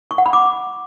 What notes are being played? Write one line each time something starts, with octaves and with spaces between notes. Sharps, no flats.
C#6
F#5
B5
D6